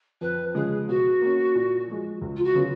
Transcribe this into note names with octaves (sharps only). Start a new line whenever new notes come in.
F2 B4
C#3 F3 G#3 G#4
B2 F#4
A#3 C#4
A#2
F3 G#3
C#2
F4
F#4
C#3 F#3 B3 F4